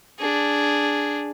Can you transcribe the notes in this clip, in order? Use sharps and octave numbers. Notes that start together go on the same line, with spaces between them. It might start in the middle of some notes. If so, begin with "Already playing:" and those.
D4 G#4